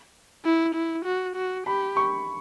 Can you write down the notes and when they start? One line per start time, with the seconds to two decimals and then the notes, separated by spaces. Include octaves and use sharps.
0.45 E4
0.75 E4
1.05 F#4
1.36 F#4
1.66 G4 B5
1.97 C#6